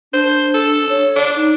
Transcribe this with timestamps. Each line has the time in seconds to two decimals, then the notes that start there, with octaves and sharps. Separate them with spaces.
0.13 D4 C5
0.54 A4
0.89 C#5
1.16 D4
1.36 D#4